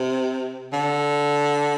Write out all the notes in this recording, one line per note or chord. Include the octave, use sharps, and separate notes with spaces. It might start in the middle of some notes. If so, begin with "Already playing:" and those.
Already playing: C3
D3